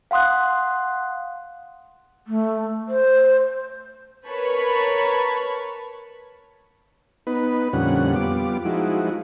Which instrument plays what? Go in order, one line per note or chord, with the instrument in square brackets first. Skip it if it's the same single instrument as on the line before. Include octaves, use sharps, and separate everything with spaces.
[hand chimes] F5 F#5 C6 D#6 F#6
[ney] A3
C5
[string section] A#4 B4 C#5 A5 B5 C#6
[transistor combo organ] B3 D#4 B4
F2 A#2 D3 G3 C#4 F#5
G3 B3 F4 D6
F3 G#3 D#4 E4 F#4